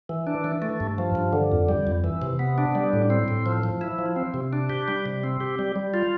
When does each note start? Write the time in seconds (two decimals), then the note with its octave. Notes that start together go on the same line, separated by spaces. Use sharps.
0.09 E3
0.27 D4
0.44 E3
0.62 A3
0.80 G2
0.98 F3
1.15 G2
1.33 D3
1.52 F2
1.69 G3
1.87 F2
2.04 E3
2.22 C3
2.39 B3
2.58 D4
2.75 G3
2.93 A2
3.10 C4
3.28 A2
3.46 F3
3.64 F3
3.81 E4
3.98 F3
4.16 C4
4.34 C3
4.53 D4
4.70 G4
4.88 G3
5.06 C3
5.24 C4
5.40 G4
5.59 G3
5.76 G3
5.94 F4